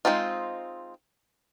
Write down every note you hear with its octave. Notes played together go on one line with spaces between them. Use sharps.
G#3 A3 C4 D#4 F4